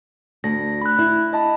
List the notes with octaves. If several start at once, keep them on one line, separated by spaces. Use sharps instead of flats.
D2 A#6
B5 F#6
E4
D#5 A5 B5